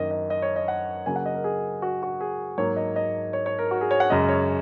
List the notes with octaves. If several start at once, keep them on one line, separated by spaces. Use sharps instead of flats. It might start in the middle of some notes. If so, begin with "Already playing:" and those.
Already playing: F#2 D#3 A#3 D#5
D#5
D#5
C#5
D#5
F#5
C#3 F#3 A#3 G#5
F#5
D#5
A#4
G#4
F#4
F#4
G#4
G#2 F#3 A#3 C#5
D#5
D#5
C#5
C#5
A#4
F#4
G#4
C#5
F#5
F#2 C#3 G#3 D#5
C#5